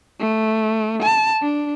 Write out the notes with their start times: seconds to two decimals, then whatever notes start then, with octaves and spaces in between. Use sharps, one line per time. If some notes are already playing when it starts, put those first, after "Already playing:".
0.20 A3
1.03 A5
1.42 D4